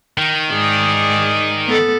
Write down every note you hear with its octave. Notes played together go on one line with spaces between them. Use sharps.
D#3
G#2 G#4 D5
B3 A4